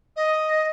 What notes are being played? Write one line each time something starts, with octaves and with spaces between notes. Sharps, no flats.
D#5